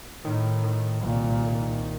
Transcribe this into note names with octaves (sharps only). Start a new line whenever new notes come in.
A2 D#3
D#3
C2 A#2
C2